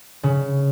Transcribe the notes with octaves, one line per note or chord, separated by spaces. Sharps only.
C#3